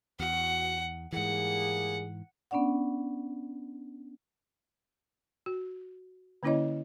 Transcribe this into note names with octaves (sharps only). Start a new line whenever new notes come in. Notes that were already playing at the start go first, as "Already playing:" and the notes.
E2 F#4 F#5
G#2 E3 G3 A#3 G#4 F#5
B3 C#4 D4 D5 F#5
F#4
D3 A#3 C#4 E4 C#5 D#5